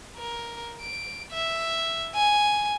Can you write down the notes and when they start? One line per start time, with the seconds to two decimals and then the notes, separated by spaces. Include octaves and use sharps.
0.17 A#4
0.82 D7
1.32 E5
2.15 G#5